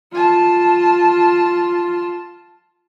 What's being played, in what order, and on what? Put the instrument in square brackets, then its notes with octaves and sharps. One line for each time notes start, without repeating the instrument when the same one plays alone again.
[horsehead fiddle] F4 A5